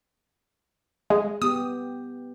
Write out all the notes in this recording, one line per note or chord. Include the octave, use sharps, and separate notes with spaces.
G#3
B3 G4 D#6